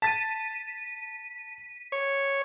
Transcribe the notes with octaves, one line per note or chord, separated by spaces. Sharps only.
A5 A6 B6 D#7
C#5